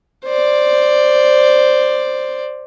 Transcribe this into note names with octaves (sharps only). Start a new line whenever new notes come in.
C5 D5